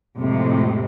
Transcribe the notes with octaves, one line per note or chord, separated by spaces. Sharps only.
F2 A2 C3 G#3